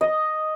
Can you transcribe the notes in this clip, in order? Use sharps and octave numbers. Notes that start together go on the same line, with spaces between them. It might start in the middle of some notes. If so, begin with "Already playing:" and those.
D#5